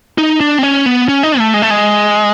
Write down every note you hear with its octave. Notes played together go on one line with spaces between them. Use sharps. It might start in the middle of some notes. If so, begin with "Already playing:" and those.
D#4
D4
C4
C#4
B3
C#4
D#4
A3
G#3
A3
G#3